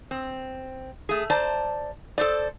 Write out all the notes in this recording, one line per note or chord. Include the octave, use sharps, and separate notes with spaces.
C4
A3 G#4
C5 D5 A5 A#5
A4 C5 D5